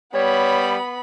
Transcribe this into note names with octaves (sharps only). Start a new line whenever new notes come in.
G3 B3 C#5 B5